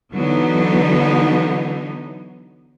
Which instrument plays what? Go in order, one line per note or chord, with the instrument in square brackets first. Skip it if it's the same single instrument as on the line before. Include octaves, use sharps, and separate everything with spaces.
[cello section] D3 E3 F#3 B3 D#4